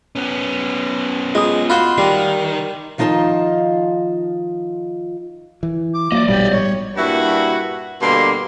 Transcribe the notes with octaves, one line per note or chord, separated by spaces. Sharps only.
B3 C#4
G#3 F4 D#6
F4 F#4 C5 B5 C6
D#3 G3 C7
D#3 F3 D#4 F4 A5
E3
D6
F3 F#3 A#3 D5 D#5
A#1 G#2 B2 G3 G4
G3 C#5
G2 A#2 E4 F#4
G2 B2 D3 A#3 C6